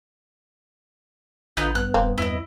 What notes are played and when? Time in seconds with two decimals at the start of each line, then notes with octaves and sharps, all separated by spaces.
1.57 A1 D3 B3 D#4 F4 G6
1.75 G2 B3 F#6
1.94 E1 A#3 C4
2.18 E2 E4 D#5